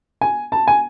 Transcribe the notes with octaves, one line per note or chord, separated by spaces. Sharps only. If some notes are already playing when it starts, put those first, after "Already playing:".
G#5
A5
G#5